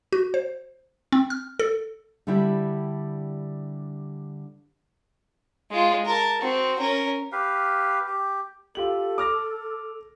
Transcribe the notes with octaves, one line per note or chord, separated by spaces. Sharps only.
F#4
C5
C4
F6
A4
D3 G3 D4 E4 G4
G#3 F4
A#4 A5
C4 F#4
C#4 A#4
G4 B4 F5
G4
F4 G4 A4 F#7
D6 F6 A#6